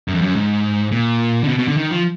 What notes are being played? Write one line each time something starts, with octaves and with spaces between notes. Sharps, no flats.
F#2
F2
F#2
G#2
A#2
D3
B2
B2
D3
D#3
F3